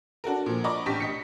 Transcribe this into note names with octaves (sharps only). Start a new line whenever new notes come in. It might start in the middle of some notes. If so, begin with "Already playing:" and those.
D4 F#4 A4 A#4
A#2 F3
D5 D#5 A#5 B5 C#6 D6
A1 D4 G4 C#6 B6
D#5 B6 C#7